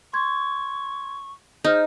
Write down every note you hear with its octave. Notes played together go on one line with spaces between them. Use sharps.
C6 C#6 G#6
D#4 G#4 C5 F6 G6